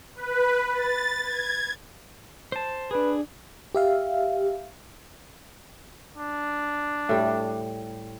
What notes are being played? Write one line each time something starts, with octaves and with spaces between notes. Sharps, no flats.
B4
A6
G#6
C5 A5
D4 G#4 B4
G4 E5 F5
D4
A2 G3